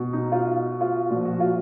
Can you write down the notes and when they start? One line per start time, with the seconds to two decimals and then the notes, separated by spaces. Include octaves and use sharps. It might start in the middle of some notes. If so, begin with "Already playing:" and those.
Already playing: B2
0.13 D#4
0.32 F4
0.81 F4
1.11 A#2 F3 F#4
1.25 F#4
1.40 F4